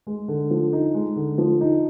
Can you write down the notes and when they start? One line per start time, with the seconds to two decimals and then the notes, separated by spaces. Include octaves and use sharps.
0.07 G#3
0.28 D3
0.50 F3
0.73 D#4
0.94 G#3
1.16 D3
1.38 F3
1.61 D#4